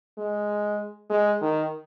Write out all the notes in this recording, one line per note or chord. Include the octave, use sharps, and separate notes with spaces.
G#3
G#3
D#3